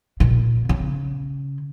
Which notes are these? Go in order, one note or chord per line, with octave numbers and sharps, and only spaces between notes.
A#2
C#3